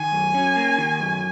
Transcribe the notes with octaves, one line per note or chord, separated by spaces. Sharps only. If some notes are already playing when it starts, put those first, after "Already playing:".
Already playing: D#3 G#5
F#2
C#4
A#3
D#3
F#2